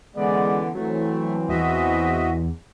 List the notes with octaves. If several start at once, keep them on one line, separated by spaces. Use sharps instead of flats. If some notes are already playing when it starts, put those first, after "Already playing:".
D3 E3 G#3 B3 C#4 D5
E3 F#3 A3 C4
E2 F#4 D#5 E5